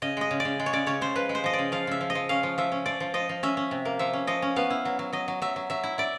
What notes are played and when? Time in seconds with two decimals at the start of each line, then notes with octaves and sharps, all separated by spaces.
0.02 C#3 D#5
0.17 G#3 D#5
0.31 C#3
0.40 D5
0.45 C#3
0.60 G#3
0.66 C#5
0.73 C#3 D5
0.87 C#3 C#5
1.01 C#3 C5
1.15 F3 B4
1.29 G#3
1.35 C5
1.44 F3 D#5
1.53 D5
1.59 C#3
1.72 F3 F5
1.87 C#3 E5
2.01 F3
2.10 D#5
2.15 F3
2.29 C#4 F5
2.43 F3
2.58 F3 E5
2.72 C#4
2.86 F3 D5
3.00 F3
3.14 F3 D#5
3.29 F3
3.43 C#4 E5
3.57 C#4
3.71 C3
3.85 A#3
3.99 F3 E5
4.13 C#4
4.27 F3 D#5
4.42 C#4
4.56 B3 F5
4.70 E4
4.85 F#3
4.99 F#3
5.13 F#3 D#5
5.28 F#3
5.42 F#3 E5
5.56 F#3
5.70 F#3 E5
5.84 E4
5.98 E4 D5